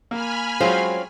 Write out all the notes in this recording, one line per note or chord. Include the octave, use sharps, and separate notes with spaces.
A#3 G#5 B5 F6
F#3 G#3 C4 C#4 F4 G#4 C5